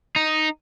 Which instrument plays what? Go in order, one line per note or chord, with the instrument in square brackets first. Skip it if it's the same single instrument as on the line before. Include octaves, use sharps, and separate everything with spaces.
[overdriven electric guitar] D#4